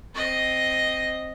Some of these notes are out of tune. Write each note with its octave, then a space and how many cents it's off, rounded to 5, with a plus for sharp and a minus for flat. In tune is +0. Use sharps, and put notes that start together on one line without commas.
C4 +0 D#5 +0